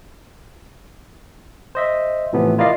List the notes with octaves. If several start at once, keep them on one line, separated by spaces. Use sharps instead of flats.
C5 D#5 E5
A2 C3 E3 F3 B3
E4 F4 A#4 D5 D#5 F5